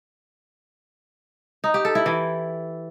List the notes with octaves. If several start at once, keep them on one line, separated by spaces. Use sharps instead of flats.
D#4
G4
A4
E4
E3